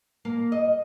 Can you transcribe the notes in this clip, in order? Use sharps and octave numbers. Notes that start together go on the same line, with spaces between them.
A#3
D#5